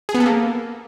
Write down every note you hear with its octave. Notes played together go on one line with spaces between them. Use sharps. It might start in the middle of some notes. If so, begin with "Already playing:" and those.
G#4
B3
A4
A#3